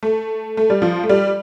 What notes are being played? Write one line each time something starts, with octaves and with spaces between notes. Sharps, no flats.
A3
A3
G3
F3
A3
G3